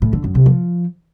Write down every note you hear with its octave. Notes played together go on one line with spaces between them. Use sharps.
A2
D3
F#2
C3
F3